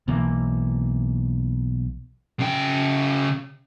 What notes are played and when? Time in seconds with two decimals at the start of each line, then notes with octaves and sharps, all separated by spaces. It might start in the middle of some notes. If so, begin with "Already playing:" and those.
0.08 B1 E3 A#3
2.40 C#3 G5